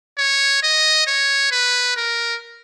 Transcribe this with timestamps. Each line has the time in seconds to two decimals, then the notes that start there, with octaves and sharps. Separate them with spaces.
0.18 C#5
0.63 D#5
1.07 C#5
1.52 B4
1.97 A#4